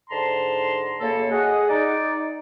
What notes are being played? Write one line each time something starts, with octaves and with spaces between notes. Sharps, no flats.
G#2 D3 A5 A#5 C6
F#2 C#3 A#3 A4
G#4 D#5 F#5
D#4 D5